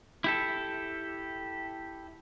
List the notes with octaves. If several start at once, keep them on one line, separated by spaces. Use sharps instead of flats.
E4 G4 A4